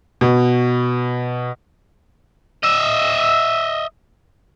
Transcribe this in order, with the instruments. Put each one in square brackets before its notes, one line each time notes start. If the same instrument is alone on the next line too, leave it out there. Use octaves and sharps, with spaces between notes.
[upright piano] B2
[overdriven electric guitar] D#5 E5